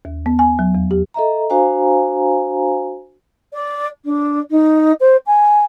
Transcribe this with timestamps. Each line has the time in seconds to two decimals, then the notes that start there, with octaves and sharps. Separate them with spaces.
0.05 D#2
0.26 B3
0.39 G#5
0.59 F#3
0.75 E2
0.91 G4
1.14 A4 D#5 E5 A#5
1.50 D4 F#4 C5 F5 G#5 A#5
3.53 D5
4.04 D4
4.50 D#4
5.00 C5
5.26 G#5